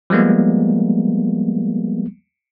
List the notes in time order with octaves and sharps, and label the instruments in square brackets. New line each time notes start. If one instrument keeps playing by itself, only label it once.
[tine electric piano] F3 G3 G#3 A#3 B3